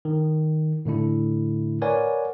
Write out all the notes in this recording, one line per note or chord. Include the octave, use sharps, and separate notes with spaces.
D#3
A2 D3 A3 E4
A#4 B4 C#5 D5 F#5 G#5